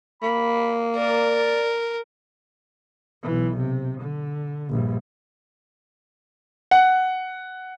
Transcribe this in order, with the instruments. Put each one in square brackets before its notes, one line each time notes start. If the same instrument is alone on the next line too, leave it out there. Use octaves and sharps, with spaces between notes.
[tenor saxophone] A#3 [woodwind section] B5
[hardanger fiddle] A#4 [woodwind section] D5
[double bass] B1 E3
C3
D3
A#1 G2
[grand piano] F#5